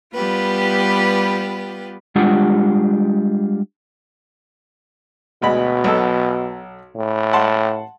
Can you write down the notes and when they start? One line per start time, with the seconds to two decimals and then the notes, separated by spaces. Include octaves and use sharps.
0.14 G3 B3 F4 G4 B4
2.15 G3 G#3 D4 F4 G4 F#5
5.42 D2 B2 G#3 B5
5.84 B1 A4
6.96 A2
7.33 F#5 A5 C6